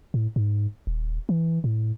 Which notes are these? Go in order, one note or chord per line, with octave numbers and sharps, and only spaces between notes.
A2
G#2
D#1
E3
A2